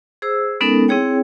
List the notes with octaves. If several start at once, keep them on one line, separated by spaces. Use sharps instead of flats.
G#4 C5 E6
G#3 B3 C#4 D#4 A4 A#4
C4 E4 G#4 C#5 G5